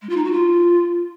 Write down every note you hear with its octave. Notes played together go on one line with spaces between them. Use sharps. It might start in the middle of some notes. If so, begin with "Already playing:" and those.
G#3
F4
D#4
F#4
F4